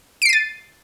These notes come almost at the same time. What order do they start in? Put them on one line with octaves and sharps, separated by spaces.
D7 C7 D#7 A6